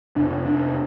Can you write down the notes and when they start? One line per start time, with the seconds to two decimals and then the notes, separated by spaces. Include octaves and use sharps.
0.16 F2 C3 D4
0.46 D4